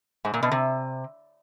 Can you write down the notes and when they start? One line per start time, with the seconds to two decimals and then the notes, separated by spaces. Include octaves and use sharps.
0.25 G#2
0.34 A#2
0.43 B2
0.52 C3